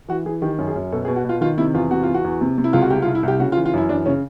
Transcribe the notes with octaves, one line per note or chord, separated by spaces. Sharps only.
E3 F#4
E3 G#4
D#3 G4
F#2
G#4
F#2
B2 A4
G#4
B2
F#4
B2 F4
D#3 F4
C3 E4
E2 F4
C3 F#4
E2 F4
F#4
E2
C3
C3
E4
C#2 F4
F#4
C2 G4
F4
C2
E4
C2 G4
C#3 F#4
F4
E3
F4
F#2 E4
E3 D4
C#3 C#4